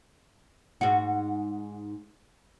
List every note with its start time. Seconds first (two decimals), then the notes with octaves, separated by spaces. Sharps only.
0.81 G#2 F#4